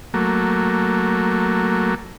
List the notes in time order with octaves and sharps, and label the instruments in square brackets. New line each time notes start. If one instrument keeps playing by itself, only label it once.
[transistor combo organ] F#3 A3 A#3